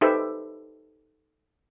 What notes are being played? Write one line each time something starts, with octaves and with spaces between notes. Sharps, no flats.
D#4 G4 A4 B4 C5 E5